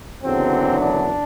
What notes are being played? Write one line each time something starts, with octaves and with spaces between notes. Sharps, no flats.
F#1 E2 D3 F#3 C4
D4